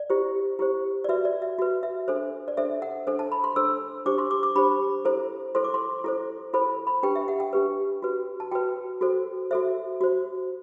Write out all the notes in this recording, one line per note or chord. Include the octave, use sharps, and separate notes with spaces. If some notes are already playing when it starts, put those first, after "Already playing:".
Already playing: D5
E4 G4 C5
E4 G4 C5
D5
F#4 B4 E5
D5
E5
F#4 B4
E5
D4 A4 C5
D5
D4 A4 C5 E5
F#5
D4 A4 C5
A5
B5
C6
D4 A4 C5 E6
D4 G4 C5 D6
C6
D6
D6
D4 G4 C5 B5
E4 A4 C5
E4 A4 C5 C6
D6
C6
E4 A4 C5
E4 A4 C5 B5
B5
D4 G4 B4 G5
E5
F#5
G5
D4 G4 B4
F#4 B4
A5
F#4 B4 G5
F#4 A4 C5
F#4 A4 C5 E5
F#4 C5